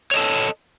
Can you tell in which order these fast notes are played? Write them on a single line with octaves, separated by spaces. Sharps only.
C#5 D#5 A4